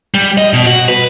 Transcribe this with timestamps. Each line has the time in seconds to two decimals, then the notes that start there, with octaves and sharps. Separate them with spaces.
0.14 G3
0.38 D#5
0.53 B2
0.67 F#4
0.89 B4